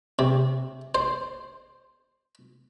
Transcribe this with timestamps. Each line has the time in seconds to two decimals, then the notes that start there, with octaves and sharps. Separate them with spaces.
0.19 C3
0.95 C5